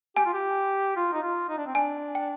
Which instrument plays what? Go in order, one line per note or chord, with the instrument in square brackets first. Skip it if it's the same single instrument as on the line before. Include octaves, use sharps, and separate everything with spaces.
[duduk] G4 [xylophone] G#5
[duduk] F4
G4
F4
D#4
F4
D#4
D4
C4
[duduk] D4 [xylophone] G#5
[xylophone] G5